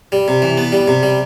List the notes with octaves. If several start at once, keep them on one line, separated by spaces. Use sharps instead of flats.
G3
C3
E3
B3
G3
C3
G3